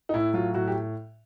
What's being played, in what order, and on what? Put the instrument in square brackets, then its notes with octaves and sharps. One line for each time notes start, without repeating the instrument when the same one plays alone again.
[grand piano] D#4
A2 E4
F#3 F4
A2 F#4
G4